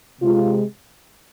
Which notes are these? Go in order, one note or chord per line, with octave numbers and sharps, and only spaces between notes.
C3 G#3 F4